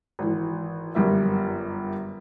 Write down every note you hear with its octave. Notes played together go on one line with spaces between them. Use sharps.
G#1 E3
G1 F#2 G3 A#4 E5